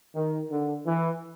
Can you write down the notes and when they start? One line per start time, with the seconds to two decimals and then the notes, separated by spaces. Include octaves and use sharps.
0.15 D#3
0.50 D3
0.87 E3